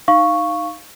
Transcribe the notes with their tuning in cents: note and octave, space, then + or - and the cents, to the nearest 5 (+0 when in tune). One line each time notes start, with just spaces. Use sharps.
D#4 +0 F5 +0 C#6 +0